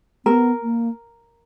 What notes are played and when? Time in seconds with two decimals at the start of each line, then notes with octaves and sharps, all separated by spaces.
0.26 B3 A#4
0.63 A#3